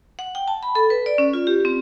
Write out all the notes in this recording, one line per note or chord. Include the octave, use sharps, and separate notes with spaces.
F#5
G5
A5
B5
A4
B4
D5
C#4
F4
G4
C4